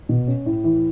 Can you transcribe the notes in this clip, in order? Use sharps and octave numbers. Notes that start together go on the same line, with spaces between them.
B2
C#4
A2
E3